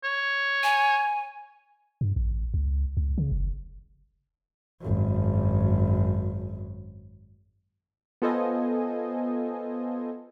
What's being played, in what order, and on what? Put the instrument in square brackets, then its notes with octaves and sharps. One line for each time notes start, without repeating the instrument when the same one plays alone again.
[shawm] C#5
[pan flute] G#5
[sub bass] G2
A1
C#2
C#2
C#3
F#1
[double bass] G#1 F#2
[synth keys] B3 F4 A4 C5 D#5 G#5